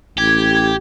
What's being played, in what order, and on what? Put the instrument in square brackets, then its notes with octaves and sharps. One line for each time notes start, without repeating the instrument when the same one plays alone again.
[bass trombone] A1 [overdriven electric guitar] G4 [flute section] G#6